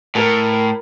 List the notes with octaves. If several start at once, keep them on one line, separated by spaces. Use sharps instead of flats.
A2 A#4